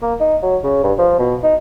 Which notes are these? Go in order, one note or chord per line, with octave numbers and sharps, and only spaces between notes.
A#3
D#4
F#3
C#3
G2
F3
B2
D#4